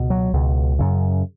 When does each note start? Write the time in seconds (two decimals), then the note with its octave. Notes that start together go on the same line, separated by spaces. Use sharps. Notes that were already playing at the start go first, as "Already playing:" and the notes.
Already playing: C#2 B2
0.10 F#3
0.33 C#2 B2
0.79 F#2 C#3